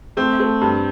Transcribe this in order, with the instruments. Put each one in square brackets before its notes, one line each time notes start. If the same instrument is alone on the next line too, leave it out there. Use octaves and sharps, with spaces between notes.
[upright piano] A3 [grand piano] C4
[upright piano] A3
G2